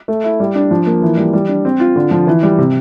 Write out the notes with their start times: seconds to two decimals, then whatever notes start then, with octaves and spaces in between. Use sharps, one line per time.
0.08 A3
0.24 E4
0.40 G3
0.55 D4
0.71 F3
0.86 A#3
1.02 E3
1.17 G3
1.33 G3
1.49 D4
1.65 C4
1.80 F4
1.96 D3
2.11 F3
2.27 E3
2.43 G3
2.58 C3